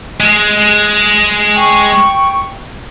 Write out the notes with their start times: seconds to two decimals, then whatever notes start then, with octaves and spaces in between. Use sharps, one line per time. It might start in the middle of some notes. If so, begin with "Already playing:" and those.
0.20 G#3
1.56 G5 C#6